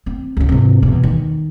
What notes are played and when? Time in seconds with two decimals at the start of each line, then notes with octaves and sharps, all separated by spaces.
0.06 C4
0.37 C#2 C#3
0.49 G#2 C3
0.82 E2 B2
1.03 D#3